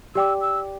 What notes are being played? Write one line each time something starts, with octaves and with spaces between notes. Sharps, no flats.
G4 D5 G5 D6 E6
E6